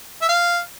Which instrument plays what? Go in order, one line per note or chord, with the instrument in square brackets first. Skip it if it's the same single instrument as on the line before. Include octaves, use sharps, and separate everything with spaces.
[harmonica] E5
F5